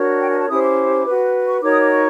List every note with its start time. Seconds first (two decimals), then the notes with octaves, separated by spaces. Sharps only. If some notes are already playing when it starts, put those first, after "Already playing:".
Already playing: D4 F#4 A#4 C#5
0.21 G5
0.30 G#5
0.40 A5
0.49 C#4 E4 G4 C5 D#6
0.63 D6
1.06 F#4 B4
1.48 C#6
1.62 D#4 F#4 A#4 C#5 D6
1.72 D#6
1.81 D6
1.91 C#6